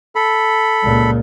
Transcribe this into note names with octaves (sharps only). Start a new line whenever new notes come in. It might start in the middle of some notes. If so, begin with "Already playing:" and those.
A4 B5
C#2 A#2